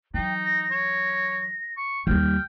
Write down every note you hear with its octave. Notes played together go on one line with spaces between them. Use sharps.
E3 F#3 D#4 G5
A#6
C#5
C#6
D#2 G3 G5 F6